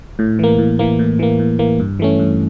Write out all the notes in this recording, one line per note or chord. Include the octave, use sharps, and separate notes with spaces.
A2
E3 A#3
A2
E3 A#3
A2
E3 A#3
A2
E3 A#3
G2
E3 A3 C#4
G2